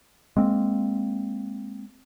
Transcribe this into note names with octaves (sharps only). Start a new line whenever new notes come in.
G#3 A#3 C4